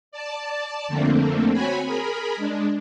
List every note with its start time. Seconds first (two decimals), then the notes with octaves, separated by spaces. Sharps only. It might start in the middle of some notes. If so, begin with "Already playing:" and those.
0.12 D5 A5
0.88 F2 D3 A3 A#3 C4
1.52 C4 F#4 C#5 G#5 B5
1.85 G#4 A#4 B5
2.37 G#3 D4